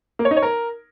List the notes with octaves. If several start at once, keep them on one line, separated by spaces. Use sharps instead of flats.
A#3
C#5
D#4
C#5
A#4